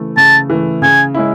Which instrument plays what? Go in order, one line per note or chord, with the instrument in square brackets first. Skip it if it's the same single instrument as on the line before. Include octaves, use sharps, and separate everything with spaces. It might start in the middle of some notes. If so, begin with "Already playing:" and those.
Already playing: [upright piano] C#3 E3 A3
[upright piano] C#3 [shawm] A5
[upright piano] E3 A3
[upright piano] C#3 [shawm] G#5
[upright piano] G#3 C#4 E4